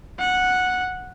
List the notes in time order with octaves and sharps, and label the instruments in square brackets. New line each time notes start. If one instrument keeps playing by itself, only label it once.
[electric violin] F#5